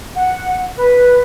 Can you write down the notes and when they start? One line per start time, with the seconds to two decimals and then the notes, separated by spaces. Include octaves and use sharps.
0.14 F#5
0.76 B4